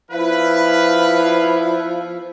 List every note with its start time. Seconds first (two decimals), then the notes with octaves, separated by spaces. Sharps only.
0.11 F3 B3 D4 E4 B4 F5